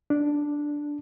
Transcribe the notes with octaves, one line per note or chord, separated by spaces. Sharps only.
D4